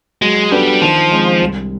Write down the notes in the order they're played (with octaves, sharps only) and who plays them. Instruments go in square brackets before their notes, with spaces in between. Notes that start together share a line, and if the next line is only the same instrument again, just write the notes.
[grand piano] F#3 [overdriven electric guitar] G#3
[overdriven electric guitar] G3 [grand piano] B3 D4 F#4 A4
[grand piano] D#3 [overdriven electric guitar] F3
[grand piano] G#3 C4
C2